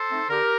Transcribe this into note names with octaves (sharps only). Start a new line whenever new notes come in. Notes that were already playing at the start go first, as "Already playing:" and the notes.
Already playing: A4 C5
A3 C4 D#4
D3 G4 A#4